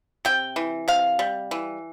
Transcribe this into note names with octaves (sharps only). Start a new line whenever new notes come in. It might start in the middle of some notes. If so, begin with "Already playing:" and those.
C3 G5
E3
C3 F5
G3
E3